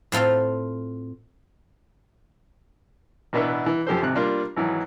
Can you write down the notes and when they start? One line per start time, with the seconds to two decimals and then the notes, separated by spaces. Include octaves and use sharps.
0.12 A2 C4 F4 A4 F5
3.33 A1 B2 B3 D4 E4 B4
3.66 E3
3.87 F#2 F3 G4 A4 C5
4.01 G#1 C3 F#6
4.15 G3 A#3 D4 F4
4.57 G#1 E3 F#3